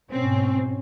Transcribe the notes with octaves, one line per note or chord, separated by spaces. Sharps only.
G#2 B2 C4 C#4